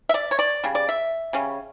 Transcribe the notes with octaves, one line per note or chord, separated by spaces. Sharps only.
E5
D5
C#5
D5
C#3 G3
D5
E5
C#3 G3 C#4